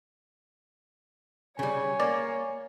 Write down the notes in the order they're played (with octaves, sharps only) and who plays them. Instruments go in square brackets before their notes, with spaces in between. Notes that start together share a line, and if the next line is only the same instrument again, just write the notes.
[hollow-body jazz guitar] C#3 G3 [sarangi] C#5 [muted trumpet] G#5
[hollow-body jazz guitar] A#3 [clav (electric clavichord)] D5